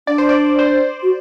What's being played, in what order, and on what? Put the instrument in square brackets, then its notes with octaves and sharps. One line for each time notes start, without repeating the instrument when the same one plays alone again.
[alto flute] D4 [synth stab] D5
[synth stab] C5
D5
C5
[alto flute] F#4